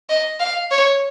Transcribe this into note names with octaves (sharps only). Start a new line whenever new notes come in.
D#5
F5
C#5